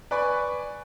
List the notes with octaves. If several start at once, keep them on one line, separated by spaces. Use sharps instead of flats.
B4 D5 G#5 B5 C#6